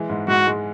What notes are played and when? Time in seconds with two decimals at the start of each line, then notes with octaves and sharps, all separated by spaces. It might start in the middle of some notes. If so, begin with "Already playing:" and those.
Already playing: E3 G#3
0.10 G#2
0.28 G#2 F#4
0.47 G#3